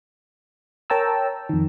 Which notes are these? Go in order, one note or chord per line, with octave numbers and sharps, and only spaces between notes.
A#4 C#5 G5 A5 A#5 E6
F2 D#3